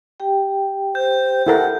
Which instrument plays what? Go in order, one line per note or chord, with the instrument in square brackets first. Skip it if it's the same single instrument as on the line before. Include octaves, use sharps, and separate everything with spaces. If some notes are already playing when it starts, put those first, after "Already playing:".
[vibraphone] G4 G5
[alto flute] C5 [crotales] G6
[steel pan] E4 A4 A#4 [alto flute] F#5